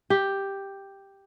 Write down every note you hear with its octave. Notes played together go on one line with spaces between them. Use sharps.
G4